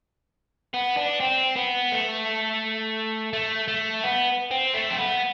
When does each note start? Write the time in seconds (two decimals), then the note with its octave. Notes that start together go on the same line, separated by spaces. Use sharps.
0.74 B3
0.97 D4
1.20 C4
1.56 B3
1.92 A3
3.33 A3
3.68 A3
4.04 B3
4.51 C4
4.74 A3
4.90 C4
4.98 B3